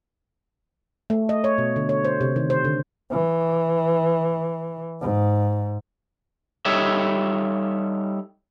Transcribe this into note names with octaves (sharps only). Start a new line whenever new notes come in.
A3
D#5
C#5
B2
D3
C#5
C5
C3
D#3
C5
D3
E3
G#2
G3 D#4 A4 C#5 E5